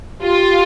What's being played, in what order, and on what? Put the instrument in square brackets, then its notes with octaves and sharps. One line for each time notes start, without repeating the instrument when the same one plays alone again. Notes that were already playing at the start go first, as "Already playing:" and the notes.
[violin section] F4 [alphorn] G4